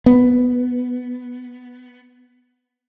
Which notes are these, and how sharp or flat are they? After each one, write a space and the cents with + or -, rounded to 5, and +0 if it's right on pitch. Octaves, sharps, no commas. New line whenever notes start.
B3 +5